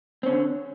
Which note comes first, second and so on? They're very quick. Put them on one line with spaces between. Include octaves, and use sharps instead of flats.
C4 C#4 D3